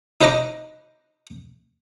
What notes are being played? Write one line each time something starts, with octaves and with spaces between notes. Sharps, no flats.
D#4 B4 C5 D#5 A#5 D6